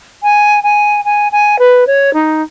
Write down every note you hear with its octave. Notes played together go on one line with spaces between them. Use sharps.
G#5
G#5
G#5
G#5
B4
C#5
D#4